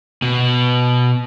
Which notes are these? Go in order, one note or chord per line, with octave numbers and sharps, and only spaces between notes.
B2